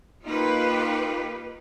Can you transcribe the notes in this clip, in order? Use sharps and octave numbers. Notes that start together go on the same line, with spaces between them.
A#3 D#4 F4 G4 B4